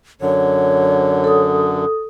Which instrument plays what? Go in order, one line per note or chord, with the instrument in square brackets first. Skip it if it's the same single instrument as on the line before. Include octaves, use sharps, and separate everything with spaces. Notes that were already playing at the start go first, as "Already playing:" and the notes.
[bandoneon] F#2 D3 [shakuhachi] C#5
[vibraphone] A4 D#6